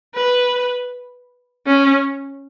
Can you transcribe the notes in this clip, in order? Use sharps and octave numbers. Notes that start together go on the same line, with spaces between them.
B4
C#4